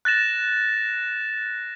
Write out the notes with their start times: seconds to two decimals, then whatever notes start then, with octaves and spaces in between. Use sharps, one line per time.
0.05 F#6 A6 A#6 E7